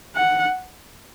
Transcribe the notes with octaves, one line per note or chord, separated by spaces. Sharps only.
F#5